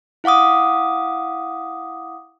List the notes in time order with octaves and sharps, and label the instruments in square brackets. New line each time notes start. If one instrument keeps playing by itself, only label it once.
[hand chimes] E4 F5 F#5 D6 D#6